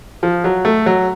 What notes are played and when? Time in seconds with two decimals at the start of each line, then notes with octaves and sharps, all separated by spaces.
0.23 F3
0.44 F#3
0.65 A3
0.86 F#3